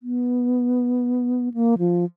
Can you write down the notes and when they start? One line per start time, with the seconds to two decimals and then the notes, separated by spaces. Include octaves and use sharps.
0.03 B3
1.54 A#3
1.78 F3